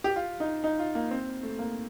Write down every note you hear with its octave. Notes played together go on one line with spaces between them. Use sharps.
G4
F4
D#4
D#4
F4
A#3
C4
A3
A#3